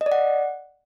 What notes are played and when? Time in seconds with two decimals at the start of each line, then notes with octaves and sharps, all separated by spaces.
0.01 D#5
0.06 D5
0.12 F#5